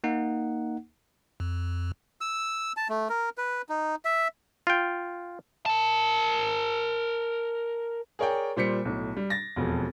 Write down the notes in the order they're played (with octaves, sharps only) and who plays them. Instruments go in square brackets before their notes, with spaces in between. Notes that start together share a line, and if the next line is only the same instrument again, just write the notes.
[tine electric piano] A#3 D#4 F#5
[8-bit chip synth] F2
[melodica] E6
A5
A3
A#4
B4
D#4
E5
[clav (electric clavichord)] F4 G5
[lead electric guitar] A#4 A5
[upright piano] G#4 A#4 C#5 D5 G5
A#2 G3 C5 B6 C#7
B1 A2
G3
A6 A#6
E1 F2